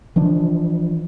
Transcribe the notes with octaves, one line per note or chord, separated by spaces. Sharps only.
E3 F3 D4